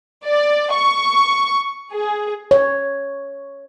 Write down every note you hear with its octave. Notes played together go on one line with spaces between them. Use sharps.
D5
C#6
G#4
C#5